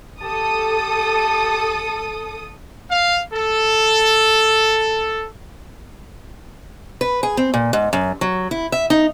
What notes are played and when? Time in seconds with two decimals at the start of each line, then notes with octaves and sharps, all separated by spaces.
0.21 G4 A4 A5 D#6
2.89 F5
3.33 A4
7.01 B4
7.23 G#4
7.37 C4
7.54 A#2
7.73 G#2
7.93 F#2
8.21 F#3
8.51 E4
8.72 E5
8.90 D#4